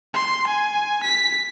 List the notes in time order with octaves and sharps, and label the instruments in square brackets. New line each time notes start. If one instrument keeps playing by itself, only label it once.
[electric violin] C6
G#5
B6